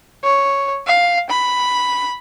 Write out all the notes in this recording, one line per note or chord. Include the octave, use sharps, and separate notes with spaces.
C#5
F5
B5